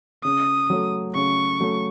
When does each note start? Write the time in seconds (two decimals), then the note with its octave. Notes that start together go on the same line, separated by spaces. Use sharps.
0.24 C#3 D#6
0.70 F#3 A3
1.15 C#3 C#6
1.60 F#3 A3